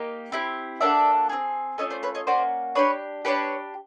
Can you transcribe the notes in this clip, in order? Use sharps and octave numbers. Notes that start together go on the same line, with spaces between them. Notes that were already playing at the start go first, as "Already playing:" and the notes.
Already playing: A#3 D#4 G4
C4 E4 G4
A#3 D4 F#4 A4 D5 E5
C4 D#4 G#4
A3 C#4 F4 C#5 D#5
C5 D5
B4 C#5
C#5 D#5
A#3 C#4 F#4 C5 D5
D4 G4 B4 C#5
D4 G4 B4 C#5